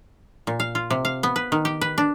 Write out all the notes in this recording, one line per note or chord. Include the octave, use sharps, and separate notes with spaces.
A#2
F5
F4
C3
F5
B3
B4
D#3
G4
B4
D4